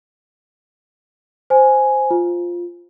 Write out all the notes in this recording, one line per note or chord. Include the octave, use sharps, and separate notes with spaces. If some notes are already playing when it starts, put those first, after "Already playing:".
C5 G#5
F4